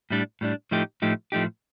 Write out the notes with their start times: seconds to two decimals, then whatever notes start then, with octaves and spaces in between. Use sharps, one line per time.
0.10 A2 G3 D4
0.41 A2 G3 D4
0.71 A2 F3 A3 D#4 G4
1.02 A2 F3 A3 D#4 G4
1.32 A2 F3 A3 D#4 G4